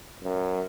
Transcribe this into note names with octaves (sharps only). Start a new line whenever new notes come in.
F#2